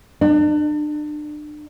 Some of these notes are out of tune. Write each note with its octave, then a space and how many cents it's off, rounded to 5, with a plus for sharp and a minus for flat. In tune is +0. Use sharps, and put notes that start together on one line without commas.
D4 +35